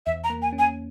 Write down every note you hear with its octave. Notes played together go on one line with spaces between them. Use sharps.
E2 E5
A#5
A#3
G#5
C#4
G#5